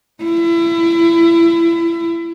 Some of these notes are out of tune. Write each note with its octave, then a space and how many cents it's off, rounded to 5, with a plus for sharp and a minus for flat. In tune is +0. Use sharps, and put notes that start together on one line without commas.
E4 +30